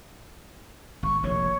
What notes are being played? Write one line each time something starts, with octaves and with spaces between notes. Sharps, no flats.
G#1 C#6
F1 A#1 A#2 C#5